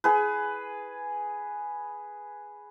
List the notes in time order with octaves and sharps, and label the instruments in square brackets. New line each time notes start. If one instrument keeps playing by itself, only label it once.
[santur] G#4 B4